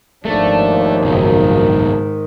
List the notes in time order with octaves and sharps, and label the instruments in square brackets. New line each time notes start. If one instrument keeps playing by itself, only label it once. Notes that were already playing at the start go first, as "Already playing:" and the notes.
[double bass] G#1 D4 [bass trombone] D#2 [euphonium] F3 [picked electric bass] A3
[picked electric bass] F#1 B1 [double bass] G#2 D#3